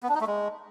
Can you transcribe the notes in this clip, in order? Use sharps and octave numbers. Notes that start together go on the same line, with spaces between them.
B3
D4
D#4
A3
G#3